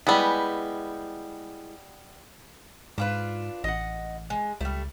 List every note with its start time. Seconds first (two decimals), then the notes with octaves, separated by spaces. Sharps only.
0.07 G3 G#3 B3 E4 G#5
2.98 G#2 D4 F4 B4
3.64 A1 D#5 F#5
4.30 G#3
4.61 C#2 G3 A3